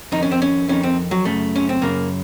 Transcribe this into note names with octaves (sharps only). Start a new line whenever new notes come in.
F2 D#3 D#4
C#4
C4
C#4
F2 D#3 C#4
C4
F#3
F#2 C#3 A3
C#4
C4
F#2 C#3 A#3